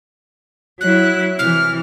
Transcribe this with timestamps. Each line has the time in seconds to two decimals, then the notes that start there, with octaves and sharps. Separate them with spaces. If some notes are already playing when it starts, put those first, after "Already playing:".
0.81 F#3 E4 F#6
1.39 C3 E3 F6